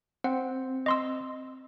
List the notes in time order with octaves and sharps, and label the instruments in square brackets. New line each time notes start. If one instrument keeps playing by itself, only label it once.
[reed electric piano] C4 [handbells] F#5
[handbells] D#5 C6 E6